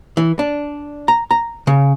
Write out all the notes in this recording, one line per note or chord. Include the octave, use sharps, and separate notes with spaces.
E3
D4
A#5
A#5
C#3